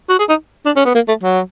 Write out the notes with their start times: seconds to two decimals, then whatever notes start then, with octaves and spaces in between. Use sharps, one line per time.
0.09 F#4
0.19 G#4
0.29 D#4
0.66 D4
0.76 C#4
0.85 B3
0.95 A#3
1.08 A3
1.23 F#3